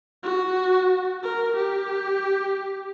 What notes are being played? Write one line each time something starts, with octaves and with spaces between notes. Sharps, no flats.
F#4
A#4
G4